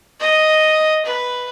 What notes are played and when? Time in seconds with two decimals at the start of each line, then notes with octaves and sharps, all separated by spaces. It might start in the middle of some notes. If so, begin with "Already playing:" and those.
0.20 D#5
1.05 B4